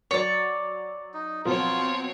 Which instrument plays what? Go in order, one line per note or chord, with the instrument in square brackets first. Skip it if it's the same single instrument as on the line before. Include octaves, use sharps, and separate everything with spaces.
[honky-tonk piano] F#3 A6 [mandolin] C#5 D5
[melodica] D#4
[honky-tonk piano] B2 F3 F#3 [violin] C4 C#5 [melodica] F4